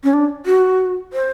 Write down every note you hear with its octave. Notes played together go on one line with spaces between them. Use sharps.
C#4
D4
F#4
C5